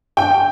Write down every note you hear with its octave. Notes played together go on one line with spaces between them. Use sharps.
G5